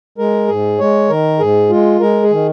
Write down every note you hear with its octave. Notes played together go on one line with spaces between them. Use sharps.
G#3 A#4
G#2 G#4
G#3 C#5
D#3 A#4
G#2 G#4
G#3 F4
G#3 A#4
G#4
D#3